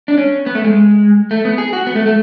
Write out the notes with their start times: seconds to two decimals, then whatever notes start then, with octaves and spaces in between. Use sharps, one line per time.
0.08 D4
0.18 C#4
0.46 B3
0.55 A3
0.64 G#3
1.31 A3
1.45 B3
1.58 G#4
1.73 F#4
1.87 B3
1.95 A3
2.06 A3